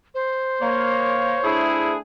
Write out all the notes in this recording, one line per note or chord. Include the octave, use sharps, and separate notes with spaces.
C5
A#3 C#5
A3 D4 E4 G#4